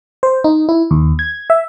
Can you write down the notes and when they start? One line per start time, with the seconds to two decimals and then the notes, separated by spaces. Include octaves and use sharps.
0.23 C5
0.44 D#4
0.69 E4
0.91 D#2
1.19 G#6
1.50 E5